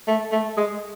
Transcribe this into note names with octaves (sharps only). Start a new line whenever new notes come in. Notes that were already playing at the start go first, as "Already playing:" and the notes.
A3
A3
G#3